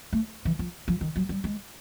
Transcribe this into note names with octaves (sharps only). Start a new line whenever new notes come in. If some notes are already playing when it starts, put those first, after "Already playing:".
A3
E3
F3
F3
D#3
F#3
G3
G#3